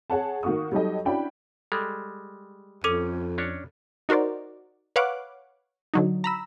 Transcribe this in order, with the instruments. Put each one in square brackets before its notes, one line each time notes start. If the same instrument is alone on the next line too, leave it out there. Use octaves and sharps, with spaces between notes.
[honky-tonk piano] G#4 C#5 F#5 A5
D#3 A#3 F#4 C#6 D#6
F#3 G3 D#4 G4 A4 D#5
C#4 D4 E4 F#4 G5 B5
[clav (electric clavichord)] G3 G#3 [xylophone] A4
[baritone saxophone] F2 [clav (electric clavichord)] C#4 [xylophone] A4 D6 D#7
[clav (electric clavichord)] C#4 D4 C#5
[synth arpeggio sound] D#4 F#4 A#4 C5 D5
B4 C#5 F5 F#5 D6 F#6
D3 F#3 D#4
A#5 B5 E6